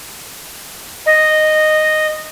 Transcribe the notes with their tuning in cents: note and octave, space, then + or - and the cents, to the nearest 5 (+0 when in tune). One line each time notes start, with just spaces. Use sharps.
D#5 -10